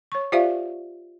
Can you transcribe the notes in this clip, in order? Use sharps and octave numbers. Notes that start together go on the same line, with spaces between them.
C#5 C#6
F4 G4 C5 D5 E5 F5